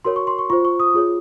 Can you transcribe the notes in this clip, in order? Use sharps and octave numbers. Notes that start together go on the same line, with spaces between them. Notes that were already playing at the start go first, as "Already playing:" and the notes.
F#4 A#4 C#5 C6
C#6
C6
C#6
F4 C5 C#6
C#6
D#6
F4 G#4 C#5